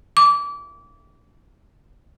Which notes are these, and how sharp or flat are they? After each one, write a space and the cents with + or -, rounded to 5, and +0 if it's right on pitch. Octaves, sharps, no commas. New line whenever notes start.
D6 -30